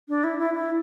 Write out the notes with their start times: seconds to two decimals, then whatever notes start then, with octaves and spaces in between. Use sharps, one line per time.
0.09 D4
0.24 E4
0.39 E4
0.54 E4